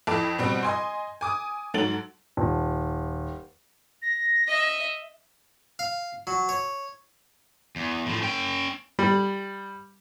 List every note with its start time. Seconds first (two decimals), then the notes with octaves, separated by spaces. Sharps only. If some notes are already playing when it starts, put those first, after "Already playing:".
0.07 F2 E4 A4 G5 A5 D6
0.39 B2 G3 C4
0.63 D#5 G#5 C6
1.21 G#5 D6 D#6
1.74 G#2 F#3 A4 A6 D7 F#7
2.37 D#1
4.02 A#6
4.48 D#5 E5
5.79 F5
6.27 F#3
6.49 C#5
7.76 E2
8.06 A2 F3
8.22 C#4 G5
8.99 G3